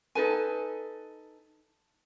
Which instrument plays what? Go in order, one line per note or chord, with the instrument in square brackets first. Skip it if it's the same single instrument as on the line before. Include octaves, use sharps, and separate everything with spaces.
[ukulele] D#4 A4 B4 G#5